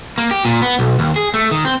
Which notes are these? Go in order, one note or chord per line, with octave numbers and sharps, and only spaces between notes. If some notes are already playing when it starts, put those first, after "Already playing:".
A#3
G4
A#2
B3
B1
D#2
G#4
A3
D#3
C4